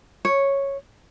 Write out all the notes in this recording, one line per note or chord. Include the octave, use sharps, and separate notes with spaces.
C#5